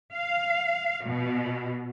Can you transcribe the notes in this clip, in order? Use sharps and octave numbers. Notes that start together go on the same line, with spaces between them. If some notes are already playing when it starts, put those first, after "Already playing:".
F5
B2